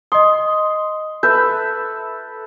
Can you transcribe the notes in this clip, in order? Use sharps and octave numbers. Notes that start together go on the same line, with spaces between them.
D#5 C6 D#6
A4 B4 E5 G6